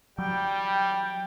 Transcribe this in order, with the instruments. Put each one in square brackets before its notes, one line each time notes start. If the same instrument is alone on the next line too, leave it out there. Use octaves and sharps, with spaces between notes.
[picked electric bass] F#3 [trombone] G3 [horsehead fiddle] G5